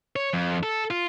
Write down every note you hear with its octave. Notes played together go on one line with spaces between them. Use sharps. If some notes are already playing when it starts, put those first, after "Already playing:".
C#5
F2
A4
F4